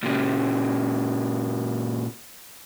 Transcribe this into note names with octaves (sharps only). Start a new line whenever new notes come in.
A#2 C#3